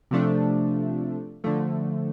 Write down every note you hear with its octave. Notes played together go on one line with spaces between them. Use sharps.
C3 F3 A3 D4
D3 F3 A3